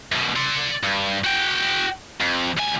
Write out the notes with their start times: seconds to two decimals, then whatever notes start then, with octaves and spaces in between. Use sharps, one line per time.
0.12 F#2 B2
0.36 D5 C6
0.83 G2
1.24 F#4 G5
2.21 F2
2.57 D2 G#5